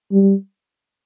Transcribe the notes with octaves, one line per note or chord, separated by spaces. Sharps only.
G3